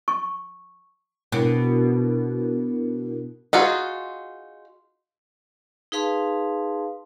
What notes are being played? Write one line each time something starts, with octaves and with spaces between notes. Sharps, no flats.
C#6
B2 D4 E4 A#4
D#4 F4 F#4 G#4
D#4 G#4 B4 F5 A5 C6